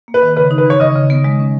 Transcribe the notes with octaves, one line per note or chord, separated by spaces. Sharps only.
A#3
B4
D#3
C#3 B4
D#4
B4
E3 C#5
C#3 D#5
C#3
B3
G#3
C#4